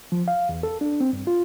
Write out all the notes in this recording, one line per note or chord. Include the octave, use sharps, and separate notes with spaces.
F3
F5
E2
A4
D4
C4
G2
F4